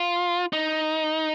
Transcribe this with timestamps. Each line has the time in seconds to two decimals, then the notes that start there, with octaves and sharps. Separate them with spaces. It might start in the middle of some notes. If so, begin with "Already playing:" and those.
Already playing: F4
0.53 D#4